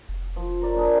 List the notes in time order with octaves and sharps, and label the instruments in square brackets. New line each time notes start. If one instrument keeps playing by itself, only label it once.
[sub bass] F1
[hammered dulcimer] F3
A#4 C#5 D5
D4 G#4 A#4